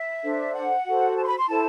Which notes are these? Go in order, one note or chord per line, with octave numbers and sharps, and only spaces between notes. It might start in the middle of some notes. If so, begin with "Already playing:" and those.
Already playing: E5
D4 A4 C5
F#5
F#4 A4 C5
A5
C6
B5
C6
E4 A4 C5 A5